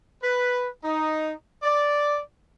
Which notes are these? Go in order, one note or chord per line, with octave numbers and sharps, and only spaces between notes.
B4
D#4
D5